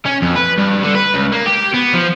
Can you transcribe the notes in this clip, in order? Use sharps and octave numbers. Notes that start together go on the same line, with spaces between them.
C#4
F2
B4
G2
D3
B4
C#2
A#3
G4
B3
F3